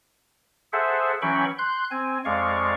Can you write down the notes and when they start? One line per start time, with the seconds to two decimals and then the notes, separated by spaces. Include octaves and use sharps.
0.73 G#4 A4 C5 E5 F#5
1.22 E3 F#3 C#4 G5 B5 C#6
1.58 C6 F#6 G6
1.91 C4 G#5
2.25 F2 G#3 D5 F5 C#6